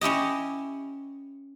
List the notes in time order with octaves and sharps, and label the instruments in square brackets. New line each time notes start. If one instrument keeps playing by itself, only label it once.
[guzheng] C#4 E4 G4 D#5